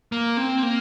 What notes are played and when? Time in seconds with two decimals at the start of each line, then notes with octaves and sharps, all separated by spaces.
0.12 A#3
0.37 C4
0.63 A#3